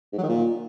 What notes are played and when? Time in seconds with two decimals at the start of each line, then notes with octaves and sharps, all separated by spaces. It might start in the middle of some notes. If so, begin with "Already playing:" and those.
0.13 G#2
0.18 F#3
0.23 D#3
0.29 A#2